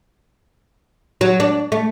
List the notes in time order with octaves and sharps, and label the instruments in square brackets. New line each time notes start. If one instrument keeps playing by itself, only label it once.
[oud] F#3
D4
A3